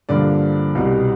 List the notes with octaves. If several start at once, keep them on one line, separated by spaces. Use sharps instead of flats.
G2 D3 F3 A#3 D4 D5
C2 B2 G3